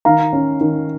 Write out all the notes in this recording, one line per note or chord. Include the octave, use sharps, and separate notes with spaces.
D#3 F5 A#5
C#4
D#3